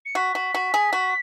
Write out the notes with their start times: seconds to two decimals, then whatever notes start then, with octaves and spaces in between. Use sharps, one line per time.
0.05 C#7
0.15 F#4 B6
0.35 F#4
0.54 F#4
0.74 G#4
0.93 F#4